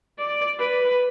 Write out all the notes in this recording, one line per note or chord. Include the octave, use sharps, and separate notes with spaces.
D5
B4